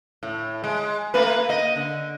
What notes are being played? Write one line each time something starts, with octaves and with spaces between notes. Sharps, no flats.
A2
G#3
A3 A#3 B4
A#3 D#5
D3